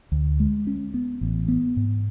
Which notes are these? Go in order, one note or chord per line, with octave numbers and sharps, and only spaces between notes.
D2
G#3
C#4
B3
A1
B3
G#2